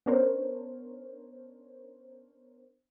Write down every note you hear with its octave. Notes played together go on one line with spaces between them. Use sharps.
B3 C#4 D4 A#4 C5 C#5